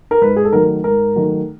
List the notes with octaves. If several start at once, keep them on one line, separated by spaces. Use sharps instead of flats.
A#4
G#2 B4
G#4
A4
D#3 F#3 A3 A#4
G#2 A#4
D#3 F#3 A3